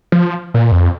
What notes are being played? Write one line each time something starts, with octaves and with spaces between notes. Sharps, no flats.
F3
A#2
F2